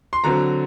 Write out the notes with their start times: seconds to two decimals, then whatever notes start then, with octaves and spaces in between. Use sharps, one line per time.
0.13 C6
0.24 D3 F#3 C4 A#5